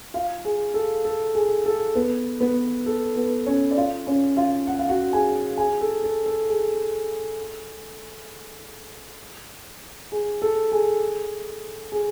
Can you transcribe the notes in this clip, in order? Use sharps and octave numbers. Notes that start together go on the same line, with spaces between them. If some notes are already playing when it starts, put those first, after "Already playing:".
F4 F5
G#4
A4
A4
G#4
A4
B3 B4
B3 B4
A4
B3 B4
C#4 C#5
D5
F4 F5
C#4 C#5
F4 F5
F#5
F5
F#4 F#5
G#4 G#5
G#4 G#5
A4
A4
A4
G#4
G#4
A4
G#4
G#4